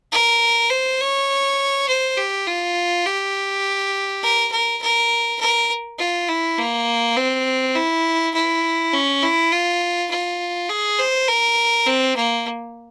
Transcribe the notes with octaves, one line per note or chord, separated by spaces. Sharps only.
A#4
C5
C#5
C5
G4
F4
G4
A#4
A#4
A#4
A#4
F4
E4
A#3
C4
E4
E4
C#4
E4
F4
F4
G#4
C5
A#4
C4
A#3